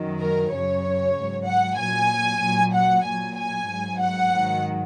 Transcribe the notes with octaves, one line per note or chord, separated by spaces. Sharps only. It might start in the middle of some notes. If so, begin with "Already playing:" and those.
Already playing: F#2 D#3 F#3
A#4
F#2 C#3 F#3 C#5
G#2 F#3
F#5
A#2 F#3 G#5
A#2 F#3
F#5
A#2 F#3 G#5
G#5
G#2 F#3
F#5
G#2 D#3 F#3